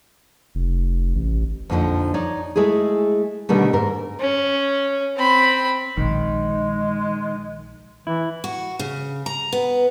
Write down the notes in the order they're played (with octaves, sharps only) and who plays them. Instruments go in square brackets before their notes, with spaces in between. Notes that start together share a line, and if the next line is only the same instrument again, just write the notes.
[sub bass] F1
A1
[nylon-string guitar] F2 A#2 D3 E3 F3 D#4
D#4 C#5 D5
G#3 A3 E4 G#4
B2 D3 D#3 G3 A3
G#2 A#4
[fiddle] C#4
C4 B5
[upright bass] A#1 [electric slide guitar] D#3 [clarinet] G#3
[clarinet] E3 [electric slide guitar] E4
[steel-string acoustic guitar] F#4
C#3
A#5
B3